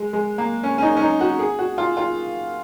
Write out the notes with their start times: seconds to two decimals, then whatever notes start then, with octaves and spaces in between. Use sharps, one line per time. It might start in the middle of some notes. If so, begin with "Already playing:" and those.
Already playing: G#3
0.13 G#3
0.38 A#3
0.64 C#4
0.78 C#4
0.82 D#4
0.97 C#4
1.01 D#4
1.21 F#4
1.39 G#4
1.59 F#4
1.78 F4
1.97 F4